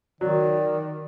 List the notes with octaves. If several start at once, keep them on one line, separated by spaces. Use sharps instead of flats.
D#3 F#3 D5